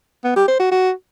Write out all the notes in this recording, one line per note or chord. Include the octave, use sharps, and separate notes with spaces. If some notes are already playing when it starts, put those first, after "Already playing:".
B3
G4
C5
F#4
F#4